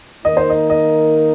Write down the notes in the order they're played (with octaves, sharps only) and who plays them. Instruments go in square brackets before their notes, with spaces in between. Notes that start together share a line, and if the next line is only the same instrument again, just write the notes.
[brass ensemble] D#3 A#3 D#4 A#4 [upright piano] D#5
[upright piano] C5
D#5
D#5